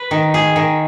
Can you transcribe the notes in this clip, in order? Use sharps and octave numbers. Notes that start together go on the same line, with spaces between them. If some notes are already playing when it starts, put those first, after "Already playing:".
Already playing: B4
D#3
G#4
D#3